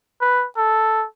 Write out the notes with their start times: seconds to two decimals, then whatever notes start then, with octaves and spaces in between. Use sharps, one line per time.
0.21 B4
0.57 A4